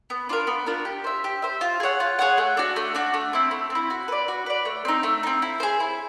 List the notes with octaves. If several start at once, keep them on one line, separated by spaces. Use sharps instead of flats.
B3
D4 F4 A#4
B3
D4 F4 A#4
G4
C5 E5
G4
C5 E5
F4
G#4 C#5 F#5
F4
G#4 C#5 F#5
A3
D4 F#4
A3
D4 F#4
A3
C4 E4
A3
C4 E4
F#4
B4 D5
F#4
B4 D5
A3
C4 D#4
A3
C4 D#4
E4
G#4 C5
E4